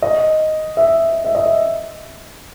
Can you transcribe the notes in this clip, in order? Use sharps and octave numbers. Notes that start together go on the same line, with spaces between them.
D#5
E5
E5
D#5
E5